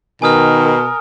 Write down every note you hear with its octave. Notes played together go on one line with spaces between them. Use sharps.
B2 D#3 A#4 G#5 D#6 F6